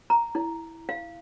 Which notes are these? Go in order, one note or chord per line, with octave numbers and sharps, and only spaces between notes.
A#5
E4
F5